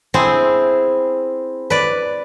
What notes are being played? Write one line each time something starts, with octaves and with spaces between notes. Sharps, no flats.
C4 E4 G#4
B4 D5